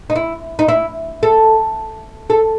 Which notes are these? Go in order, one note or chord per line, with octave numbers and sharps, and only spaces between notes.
D#4
E4
D#4
E4
A4
A4